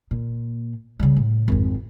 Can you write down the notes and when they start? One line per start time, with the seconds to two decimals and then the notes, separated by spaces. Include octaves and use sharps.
0.11 A#2
0.99 C#3 G3
1.16 A2
1.48 G#1 F2